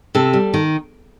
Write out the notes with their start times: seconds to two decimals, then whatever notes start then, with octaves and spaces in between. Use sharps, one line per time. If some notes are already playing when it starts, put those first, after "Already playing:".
0.15 C3 A4
0.33 G3
0.54 D#3